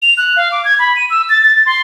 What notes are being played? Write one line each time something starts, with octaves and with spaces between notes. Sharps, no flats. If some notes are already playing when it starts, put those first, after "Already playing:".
F7
F#6
F5
D6
G#6
B5
D#7
E6
A6
A6
C6